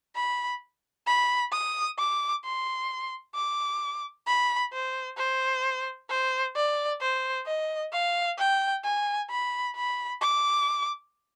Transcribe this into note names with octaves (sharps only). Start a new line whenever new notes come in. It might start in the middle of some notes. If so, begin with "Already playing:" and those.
B5
B5
D#6
D6
C6
D6
B5
C5
C5
C5
D5
C5
D#5
F5
G5
G#5
B5
B5
D6